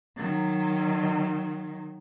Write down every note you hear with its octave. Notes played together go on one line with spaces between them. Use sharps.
D#3 F#3